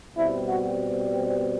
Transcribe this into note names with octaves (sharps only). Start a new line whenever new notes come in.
B2 G3 C4 E4
F#4